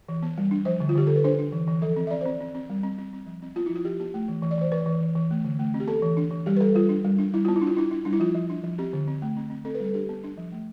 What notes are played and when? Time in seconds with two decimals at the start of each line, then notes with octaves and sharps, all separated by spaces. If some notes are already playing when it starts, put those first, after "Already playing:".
0.09 E3
0.23 B3
0.38 G3
0.51 D4
0.65 F3 C5
0.80 D3
0.89 F4
0.95 D3 G4
1.07 D3 A4
1.16 B4
1.24 D4 C5
1.39 D4
1.52 E3
1.67 E3
1.82 F3 A4
1.96 C4
2.07 E5
2.11 C4 D5
2.21 C4 C5
2.41 C4
2.55 C4
2.70 G3
2.83 C4
2.98 C4
3.13 C4
3.26 F3
3.42 C4
3.56 B3 F4
3.66 F3 E4
3.76 F4
3.85 F3 G4
4.00 B3 G4
4.14 A3
4.28 E3
4.42 E3
4.51 D5
4.58 E3 C5
4.72 E3 B4
4.86 E3
5.00 E3
5.15 E3
5.31 A3
5.45 D3
5.59 A3
5.74 C4
5.80 G4
5.88 B3 A4
6.02 E3
6.17 D4
6.31 E3
6.46 G3 G4
6.57 B4
6.60 G3 A4
6.75 G3 F4
6.89 D4
7.05 G3
7.18 D4
7.34 G3 E4
7.45 B3 F4
7.56 E4
7.62 D4
7.67 F4
7.76 D4 E4
7.91 D4
8.05 G3 D4
8.13 E4
8.20 F3 F4
8.34 F3
8.50 D4
8.64 F3
8.78 C4 G4
8.93 D3
9.07 C4
9.22 A3
9.37 C4
9.50 C4
9.65 C4 A4
9.75 B4
9.80 G3 A4
9.94 D4 G4
10.09 B3
10.24 D4
10.37 F3
10.52 A3